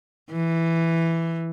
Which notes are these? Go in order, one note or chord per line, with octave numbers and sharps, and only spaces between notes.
E3